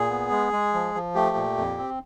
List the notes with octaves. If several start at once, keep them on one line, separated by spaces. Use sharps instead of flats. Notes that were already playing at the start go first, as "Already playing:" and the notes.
Already playing: A#2 G#4
B3
G#3
G#3
F3
F3
A3 G4
A#2
F2
C4